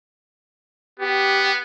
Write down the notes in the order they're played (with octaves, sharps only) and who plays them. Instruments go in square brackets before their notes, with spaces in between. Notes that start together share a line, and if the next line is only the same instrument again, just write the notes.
[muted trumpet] B3 [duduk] G4